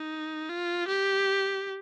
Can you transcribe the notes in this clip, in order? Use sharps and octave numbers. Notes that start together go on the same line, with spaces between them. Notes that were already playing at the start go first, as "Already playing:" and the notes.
Already playing: D#4
F4
G4